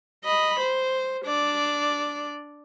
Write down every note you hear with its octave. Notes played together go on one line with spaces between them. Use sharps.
D#5 B5
C5
D4 D5